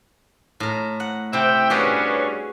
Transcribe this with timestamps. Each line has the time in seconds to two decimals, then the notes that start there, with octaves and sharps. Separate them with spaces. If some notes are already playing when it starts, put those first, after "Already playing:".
0.60 A2 A#4
1.00 F#5
1.33 C3 E4 E5 G5
1.70 G2 C#4 F#4 G#4 B4